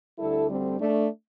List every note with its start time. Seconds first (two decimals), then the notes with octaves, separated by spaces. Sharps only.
0.19 D2 D3 G3 E4 A4
0.49 G3 C4
0.80 A3 D4